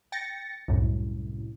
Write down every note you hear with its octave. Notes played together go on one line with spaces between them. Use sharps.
G5 A6 A#6 C#7
C2 F#2 A2